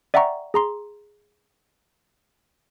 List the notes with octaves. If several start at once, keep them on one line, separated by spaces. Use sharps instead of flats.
D5 E5 F#5 G5 A#5 C#6
G#4 A#5 C6